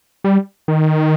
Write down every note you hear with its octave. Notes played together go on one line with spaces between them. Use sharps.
G3
D#3